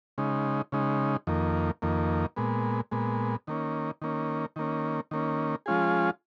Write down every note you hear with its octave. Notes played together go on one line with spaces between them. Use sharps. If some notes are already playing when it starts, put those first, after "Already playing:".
C#3 G#3 D#4
C#3 G#3 D#4
F2 D#3 A#3
F2 D#3 A#3
A#2 G#3 B3
A#2 G#3 B3
D#3 A#3 C#4
D#3 A#3 C#4
D#3 A#3 C#4
D#3 A#3 C#4
F3 G#3 C#4 F4 G#4